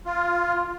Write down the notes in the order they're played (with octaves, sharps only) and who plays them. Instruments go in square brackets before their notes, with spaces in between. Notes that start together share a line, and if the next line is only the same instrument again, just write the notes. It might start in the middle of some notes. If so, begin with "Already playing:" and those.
[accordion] F4